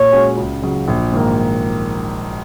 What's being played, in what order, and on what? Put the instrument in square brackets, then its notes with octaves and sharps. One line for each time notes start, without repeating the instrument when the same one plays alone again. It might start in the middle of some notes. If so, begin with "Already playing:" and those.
Already playing: [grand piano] A#2 [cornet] C#5
[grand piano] G#3 C#4 F#4
C#2
C#3 F#3
A#1
G#2 D#3 A#3